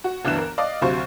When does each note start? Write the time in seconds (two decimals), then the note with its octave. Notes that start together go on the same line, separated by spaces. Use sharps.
0.04 F#4
0.25 G1 D2 E3 D4 F#6 E7
0.38 A#4
0.58 D5 D#5 F5
0.82 D2 C3 F#3 C5 F5 C#6